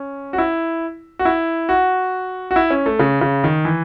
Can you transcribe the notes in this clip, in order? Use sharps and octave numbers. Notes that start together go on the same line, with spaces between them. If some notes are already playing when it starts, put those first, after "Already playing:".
Already playing: C#4
F#4
E4
F#4
E4
F#4
F#4
E4
C#4
A3
C#3
C#3
D#3
E3